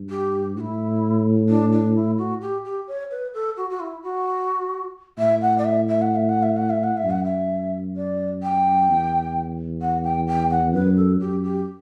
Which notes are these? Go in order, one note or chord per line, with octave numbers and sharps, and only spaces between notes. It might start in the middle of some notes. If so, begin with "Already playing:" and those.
Already playing: G2
G4
A2 E4 F#4
D4
D4
E4
F#4
G4
G4
C#5
B4
A4
F#4
F#4
E4
F#4
A2 E5
F#5
D5
E5
E5
F#5
E5
F#5
E5
F#5
E5
F#5
E5
F#2
F#5
E5
D5
G5
E2
F#5
G5
G5
F#5
F#2 B4
A4
F#2 G4
G4